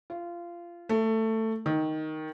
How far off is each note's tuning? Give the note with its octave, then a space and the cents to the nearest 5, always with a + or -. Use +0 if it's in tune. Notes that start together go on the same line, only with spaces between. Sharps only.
F4 -20
A3 +15
D#3 +5